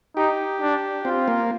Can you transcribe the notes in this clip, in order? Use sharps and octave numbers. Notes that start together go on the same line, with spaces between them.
D#4 G4
D4
C4 F4
A#3